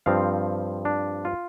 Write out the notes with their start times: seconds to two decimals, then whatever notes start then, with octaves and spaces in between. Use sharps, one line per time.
0.06 G2 F3 C4 F5
0.85 D4
1.25 F4